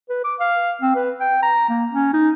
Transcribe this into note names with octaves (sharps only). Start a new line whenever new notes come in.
B4
D6
F5
C4
B4
G5
A#5
A#3
C#4
D#4